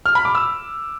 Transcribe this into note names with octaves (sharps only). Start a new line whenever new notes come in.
F6
B5
D6
E6